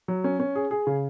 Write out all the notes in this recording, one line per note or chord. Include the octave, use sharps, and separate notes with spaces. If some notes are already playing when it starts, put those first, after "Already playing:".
F#3
C#4
C#4
G#4
G#4
C#3